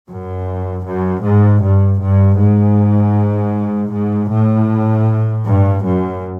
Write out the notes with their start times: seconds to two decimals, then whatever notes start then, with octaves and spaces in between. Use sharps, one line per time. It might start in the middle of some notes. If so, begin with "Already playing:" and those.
0.10 F#2
0.87 F#2
1.25 G#2
1.63 G2
2.02 G2
2.40 G#2
3.93 G#2
4.32 A2
5.46 G2
5.84 F#2